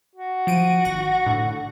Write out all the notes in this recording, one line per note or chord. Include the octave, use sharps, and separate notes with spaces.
F#4
F3 D7 D#7
G#1 F#5 A#6
A2 D3